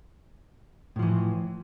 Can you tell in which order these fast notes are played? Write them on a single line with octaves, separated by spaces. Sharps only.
A2 F3 E3